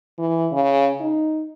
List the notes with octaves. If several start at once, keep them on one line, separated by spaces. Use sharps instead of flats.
E3
C#3
D#4